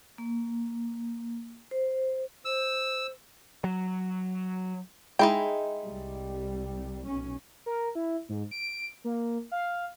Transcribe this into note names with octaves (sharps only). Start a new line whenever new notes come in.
A#3
C5
C5 E6
F#3
G#3 D#4 E4 G5
C2 G3
B1 C#4
A#4
E4
G#2
D7
A#3
F5